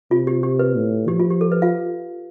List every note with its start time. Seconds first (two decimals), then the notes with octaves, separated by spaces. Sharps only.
0.11 C3 F4
0.27 G4
0.43 G4
0.59 B4
0.76 A2
1.08 F3 G4
1.19 F4
1.30 G4
1.41 A4
1.52 B4
1.62 F4 F5